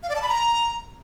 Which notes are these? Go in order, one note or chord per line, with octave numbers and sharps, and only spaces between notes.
F5
D5
A5
B5
A#5